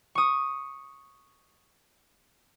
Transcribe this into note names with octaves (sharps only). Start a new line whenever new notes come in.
C#6 D#6